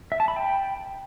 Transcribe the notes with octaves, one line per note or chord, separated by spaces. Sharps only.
E5
A5
B5
G5